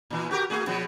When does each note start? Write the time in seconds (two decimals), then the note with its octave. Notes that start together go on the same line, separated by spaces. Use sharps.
0.10 A#2 E3
0.31 F#4 G4 A#4
0.50 A3 F#4 G#4
0.67 B2 F3 B3